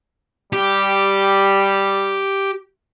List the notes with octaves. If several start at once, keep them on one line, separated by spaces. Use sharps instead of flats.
G3 G4